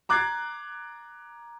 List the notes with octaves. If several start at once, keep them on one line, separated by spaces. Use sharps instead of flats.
A#5 D6 F#6 G#6 A6 C7